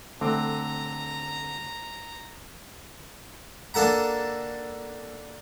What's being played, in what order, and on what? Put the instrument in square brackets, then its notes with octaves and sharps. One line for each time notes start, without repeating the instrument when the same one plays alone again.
[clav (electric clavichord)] D3 C4 G5 [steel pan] A3 [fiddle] A#5
[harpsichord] A#3 D4 A4 F#5 A#5